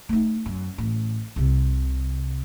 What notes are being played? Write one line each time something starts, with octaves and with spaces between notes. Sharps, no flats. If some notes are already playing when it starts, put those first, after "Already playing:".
A3 D#4
F#2
A1
C2 C3